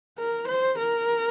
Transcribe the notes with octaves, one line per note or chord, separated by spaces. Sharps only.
A#4
C5
A#4